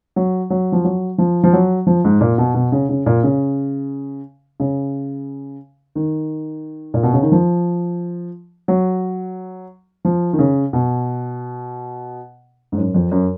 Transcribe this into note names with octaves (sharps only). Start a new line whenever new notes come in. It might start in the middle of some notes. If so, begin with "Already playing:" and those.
F#3
F#3
F3
F#3
F3
F3
F#3
F3
G#2
A#2
B2
B2
C#3
C#3
A#2
C#3
C#3
D#3
A#2
B2
C#3
D#3
F3
F#3
F3
D#3
C#3
B2
G#2
F#2
F2
F#2